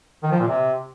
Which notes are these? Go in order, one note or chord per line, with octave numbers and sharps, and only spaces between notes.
D#3
F3
A#2
C3